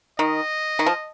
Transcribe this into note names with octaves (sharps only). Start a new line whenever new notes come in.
D#3 D#5
D#3
F3